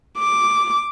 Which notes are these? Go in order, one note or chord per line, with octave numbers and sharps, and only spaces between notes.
D6